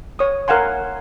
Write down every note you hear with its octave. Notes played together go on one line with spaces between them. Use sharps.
C#5 D#6
A#4 F5 F#5 G#5 C6